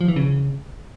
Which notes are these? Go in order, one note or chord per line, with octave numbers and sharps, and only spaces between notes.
F3
E3
C#3